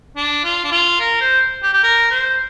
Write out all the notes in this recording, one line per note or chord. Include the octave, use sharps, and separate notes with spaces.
D4
F4
D4
F4
A#4
C5
G4
G4
A#4
C5